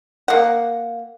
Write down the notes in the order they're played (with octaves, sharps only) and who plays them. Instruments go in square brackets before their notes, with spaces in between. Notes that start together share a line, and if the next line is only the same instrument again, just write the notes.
[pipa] A#3 F#5